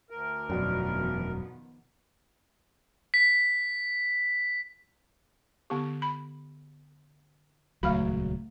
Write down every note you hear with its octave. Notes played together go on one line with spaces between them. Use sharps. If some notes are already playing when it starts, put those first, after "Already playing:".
D2 A#4
E1 F#2 B2 D#3 F3 B3 D5
B6
D3 B3 G4
B5
D#1 C#2 F#3 A3 F5 B5